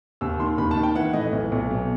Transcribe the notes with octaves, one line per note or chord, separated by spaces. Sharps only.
D#2 E6
D#3 C6
D#2 B5
A5
D#3
G5
E3 F#5
A2 D#5
B1
B1
B2